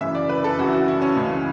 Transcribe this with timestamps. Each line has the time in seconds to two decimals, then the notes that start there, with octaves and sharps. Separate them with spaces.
0.01 F#2 C#3 E3 E5
0.15 D5
0.29 B4
0.44 A4
0.58 F#2 C#3 E3 F#4
0.67 E4
0.73 F#4
0.88 E4
1.02 C#4
1.16 C#2 C#3 E3